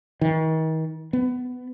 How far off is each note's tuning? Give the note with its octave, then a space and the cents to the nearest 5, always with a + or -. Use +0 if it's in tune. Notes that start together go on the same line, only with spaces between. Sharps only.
D#3 +40
B3 +15